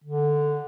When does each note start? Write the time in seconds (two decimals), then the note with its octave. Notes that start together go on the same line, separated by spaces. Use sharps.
0.04 D3